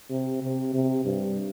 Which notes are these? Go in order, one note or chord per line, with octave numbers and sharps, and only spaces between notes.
C3
C3
C3
G2